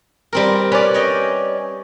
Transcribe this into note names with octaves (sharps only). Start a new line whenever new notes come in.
G3 C4 A#4
C#4 B4 D5
C#5 D#5 G5